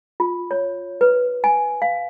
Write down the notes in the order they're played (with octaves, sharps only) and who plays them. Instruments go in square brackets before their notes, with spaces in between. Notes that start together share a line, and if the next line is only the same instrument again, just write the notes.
[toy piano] F4
C#5
B4
G#5
F5